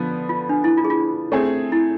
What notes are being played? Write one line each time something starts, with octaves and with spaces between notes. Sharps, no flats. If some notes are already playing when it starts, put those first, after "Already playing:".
Already playing: D3 F3 B3 B4
F4
D4
E4
F4
G#4
F4
A3 C4 G#4
E4